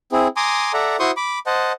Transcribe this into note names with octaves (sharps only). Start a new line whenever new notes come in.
C4 E4 G#4
G#5 A#5 C6 D6 D#6
A4 D5 E5 F#5 A#5
E4 F#4 C5 C6 C#6 D#6
B5 D6
C5 D#5 F#5 A5